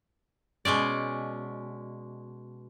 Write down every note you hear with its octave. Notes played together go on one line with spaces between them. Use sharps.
B2 G#3 C#4 D5